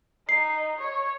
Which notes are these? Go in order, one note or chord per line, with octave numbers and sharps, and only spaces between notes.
D#4 C7
C#5